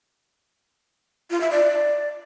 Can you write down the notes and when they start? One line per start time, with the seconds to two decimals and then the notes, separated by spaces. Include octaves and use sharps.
1.31 F4
1.41 E5
1.51 D5